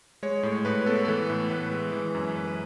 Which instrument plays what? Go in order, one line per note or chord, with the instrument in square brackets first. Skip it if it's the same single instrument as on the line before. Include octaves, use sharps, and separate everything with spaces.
[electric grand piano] G#3 C#5
A2
A2 B4
B3 A4
B4
E3 A4
A2
A2 B4
G#3
E3
F#2
F#2 B4
B4